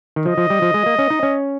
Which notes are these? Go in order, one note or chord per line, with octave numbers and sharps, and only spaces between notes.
D#3
F3 D#5
F3
G3
F3
G#3
A#3
C#4
D#4
C#4